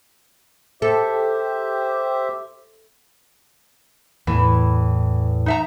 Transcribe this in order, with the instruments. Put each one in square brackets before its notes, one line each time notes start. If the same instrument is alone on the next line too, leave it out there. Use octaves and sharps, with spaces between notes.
[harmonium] G4 C5 E5 [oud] A4
[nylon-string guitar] E2 A2 [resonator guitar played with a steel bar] E3
[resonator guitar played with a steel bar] D#4 E5 A#5